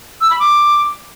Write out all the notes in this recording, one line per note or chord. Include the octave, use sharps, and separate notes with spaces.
E6
B5
D6